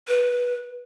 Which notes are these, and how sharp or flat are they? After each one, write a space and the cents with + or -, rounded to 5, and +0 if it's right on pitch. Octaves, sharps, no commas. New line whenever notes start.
B4 -15